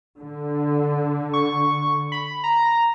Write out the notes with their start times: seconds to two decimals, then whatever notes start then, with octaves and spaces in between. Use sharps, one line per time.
0.19 D3
1.33 C#6
2.12 B5
2.44 A#5